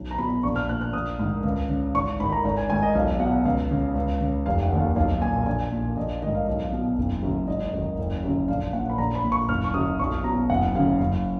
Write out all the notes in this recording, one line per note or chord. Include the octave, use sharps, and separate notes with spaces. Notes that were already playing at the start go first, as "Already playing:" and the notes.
Already playing: B1
A#5
B2 B5
A#1 C#6
F6
A#2 F#6
F#6
A#1 D#6
G#2 D#3
C#2
C#3
G#1 C#6
G#2 D#3 B5
A#5
G#1 A#5
G#5
G#2 D#3 G#5
D#5
B1 F5
B2 F#5
C#2 F5
C#3
C#2
C#3
F1 F5
F#5
D#2 D#3
F5
B1 F5
A#2 G#5
A#1 G#5
A#2
A#1 D#5
G#2 D#3 D#5
F5
B1
B2
F#1
F#2 C#3
G#1 D#5
F#2 D#3
F#1
F#2 C#3
A#1 F5
A#2 F#5
B5
A#1 A#5
B5
A#2
C#6
F#1 F6
C#6
F#2 C#3 D#6
B1 C#6
B2 A#5
F#1 F#5
F#2 C#3 F5
F#1